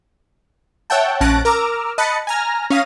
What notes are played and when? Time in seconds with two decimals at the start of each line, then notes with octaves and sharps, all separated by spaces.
0.90 C#5 E5 F#5 G5 A5
1.21 A#1 C#4 A5 F#6 A#6 D7
1.45 A#4 A#5 D6 E6 F6
1.98 D#5 A5 B5 F#6 A6 C#7
2.27 G#5 A#5 F6
2.70 C#4 F5 D#6 A#6